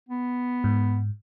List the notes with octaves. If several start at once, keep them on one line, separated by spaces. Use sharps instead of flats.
B3
G#2